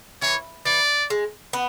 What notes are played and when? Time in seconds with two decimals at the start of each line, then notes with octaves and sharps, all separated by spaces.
0.22 E3 C#5
0.65 E3 D5
1.10 G#3
1.53 B3